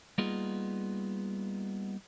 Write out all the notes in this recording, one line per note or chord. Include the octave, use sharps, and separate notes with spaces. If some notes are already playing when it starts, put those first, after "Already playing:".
G3 A#3 B3 D#4 F4 G#4